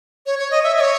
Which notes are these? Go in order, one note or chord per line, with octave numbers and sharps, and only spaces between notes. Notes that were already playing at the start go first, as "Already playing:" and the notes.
C#5
C#5
D#5
E5
D#5
C#5